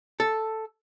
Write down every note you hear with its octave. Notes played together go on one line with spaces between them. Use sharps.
A4